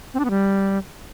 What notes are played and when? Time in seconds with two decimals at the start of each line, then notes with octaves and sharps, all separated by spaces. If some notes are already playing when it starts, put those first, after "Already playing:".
0.14 C4
0.19 D4
0.25 B3
0.30 G3